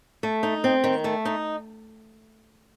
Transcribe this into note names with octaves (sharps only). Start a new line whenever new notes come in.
A3
D#4
C4
D#3
A3
D#4